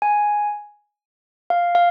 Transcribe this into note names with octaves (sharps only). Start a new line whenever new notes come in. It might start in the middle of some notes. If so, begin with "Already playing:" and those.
G#5
F5
F5